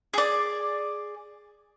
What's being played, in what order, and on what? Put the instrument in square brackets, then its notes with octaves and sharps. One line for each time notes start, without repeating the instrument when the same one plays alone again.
[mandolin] G#4 D5